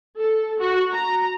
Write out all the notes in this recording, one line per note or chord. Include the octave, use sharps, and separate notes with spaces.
A4
F#4
A#5